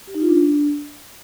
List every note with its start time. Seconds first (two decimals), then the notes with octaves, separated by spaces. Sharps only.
0.07 G4
0.14 D#4
0.22 F4
0.29 D4